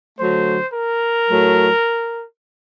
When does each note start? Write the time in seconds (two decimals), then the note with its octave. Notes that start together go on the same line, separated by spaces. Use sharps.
0.19 D3 F#3 A3 C5
0.74 A#4
1.30 A2 F#3 A3